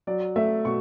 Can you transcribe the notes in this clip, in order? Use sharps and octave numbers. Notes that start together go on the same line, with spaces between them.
F#3 D5
A3 E5
B2 C#6